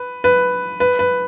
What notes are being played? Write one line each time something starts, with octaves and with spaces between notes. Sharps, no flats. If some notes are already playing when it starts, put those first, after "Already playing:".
Already playing: B4
B4
B4
B4